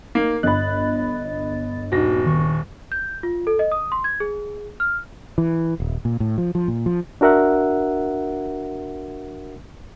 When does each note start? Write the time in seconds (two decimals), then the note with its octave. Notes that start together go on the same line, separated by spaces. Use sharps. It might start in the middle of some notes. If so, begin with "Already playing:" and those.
0.15 A#3 D#4
0.43 G1 D#5 B5 F#6 A6
1.92 D#1 D#4 F#4 A#6
2.26 D#3 C#6
2.92 G6
3.23 F4
3.47 A4
3.59 D#5
3.72 D#6
3.92 C6
4.04 G#6
4.20 G#4
4.80 F6
5.38 E3
5.80 D#1
6.05 A#2
6.20 A2
6.38 F3
6.55 F3
6.68 A#2
6.86 F3
7.21 D4 F#4 A#4 E5 F#5